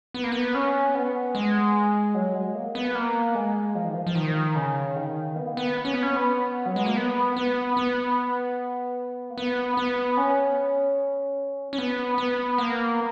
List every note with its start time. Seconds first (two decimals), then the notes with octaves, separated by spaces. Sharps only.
0.14 B3
0.23 A#3
0.32 B3
0.54 C#4
0.95 B3
1.35 G#3
2.15 F#3
2.35 G#3
2.55 A#3
2.75 B3
2.95 A#3
3.35 G#3
3.75 F3
3.85 D#3
3.94 F3
4.07 F3
4.15 D#3
4.55 C#3
4.96 D#3
5.36 B3
5.46 A#3
5.57 B3
5.85 C#4
5.94 B3
6.02 C#4
6.16 B3
6.66 F#3
6.76 G#3
6.86 A#3
6.97 B3
7.36 B3
7.77 B3
9.30 A#3
9.38 B3
9.77 B3
10.17 C#4
11.73 C#4
11.78 B3
12.18 B3
12.58 A#3